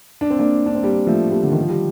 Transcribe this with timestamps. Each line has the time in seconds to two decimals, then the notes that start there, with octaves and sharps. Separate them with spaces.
0.21 D4
0.30 C4
0.39 A#3 D4
0.66 D4
0.75 C4
0.83 G3 A#3
1.07 F3 A3
1.31 G3 A#3
1.43 D3
1.52 D#3
1.61 F3
1.70 G3